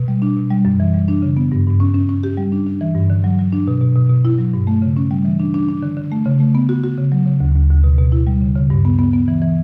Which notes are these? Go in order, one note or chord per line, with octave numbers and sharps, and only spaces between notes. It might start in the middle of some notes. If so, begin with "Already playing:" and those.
Already playing: B2
G3
D4
B2
G3
F#2
E3
G3
D4
C#3
B3
G2
G2
C#4
C#4
C#4
G4
G3
D4
D4
E3
G2
D3
F#3
F#3
D4
B2
B2
B2
B2
E4
F#3
G2
A3
C#3
C#4
G3
E3
D4
D4
D4
D3
D3
A3
C#3
A3
B3
F#4
F#4
C#3
F#3
C#3
D2
D2
D2
B2
B2
E4
G3
C#3
C#3
G2
B3
B3
B3
E3
E3